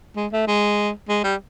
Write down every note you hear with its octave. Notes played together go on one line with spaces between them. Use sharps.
G#3
A3
G#3
G#3
G3